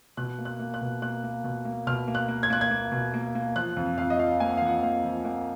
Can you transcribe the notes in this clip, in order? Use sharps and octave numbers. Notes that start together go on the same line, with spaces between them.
B2 F#6
A#3
F#6
A#3
F#6
B2
A#3 F#6
A#3
B2
A#3
B2 F6
A#3
F#6
A#3
G#6
A#3 F#6
G#6
A#3
B2
A#3
A#3
F3 F#6
F2
F2 F5
D#5
F3 F5
A#3 G#5
F#5
F5
F3 F#5
A#3 F5
F3
A#3 F#5